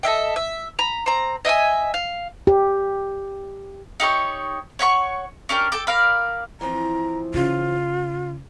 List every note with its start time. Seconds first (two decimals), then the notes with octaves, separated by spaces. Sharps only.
0.03 A4 D#5 E5 G5
0.36 E5
0.79 A#5 B5
1.06 C4 A#5
1.45 D#5 E5 G5 G#5
1.94 F5
2.47 G4
4.00 D#4 G4 A4 C#5
4.79 C#5 F#5 B5 C#6
5.49 C#4 D4 G4 A#4
5.72 A4 G5 D6
5.87 A#4 D5 F5 B5
6.61 E3 F3 C4 A#5
7.34 C#3 F4